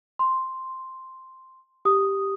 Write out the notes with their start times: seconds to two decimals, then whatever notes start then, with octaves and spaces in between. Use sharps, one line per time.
0.19 C6
1.85 G4 D#6